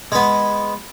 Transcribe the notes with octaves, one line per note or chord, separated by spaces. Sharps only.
G#3 B3